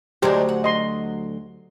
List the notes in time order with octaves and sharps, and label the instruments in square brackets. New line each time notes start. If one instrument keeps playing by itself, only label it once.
[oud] D2 F#3 C5 [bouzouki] G#3 D4 D#4 [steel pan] G4
[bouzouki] F#5
[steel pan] D#5 C6